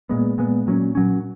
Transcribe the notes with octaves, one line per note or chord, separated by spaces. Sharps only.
A#2 G#3 B3
A#2 G#3 B3
A#2 F#3 C#4
A#2 F#3 C#4